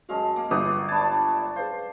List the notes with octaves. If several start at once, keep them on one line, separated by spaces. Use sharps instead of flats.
F#2 G#3 F#4 F5 A5
A#3
G1 B4 D6 D#6
D4 A5 B5 G#6
G#4 B4 C5 F5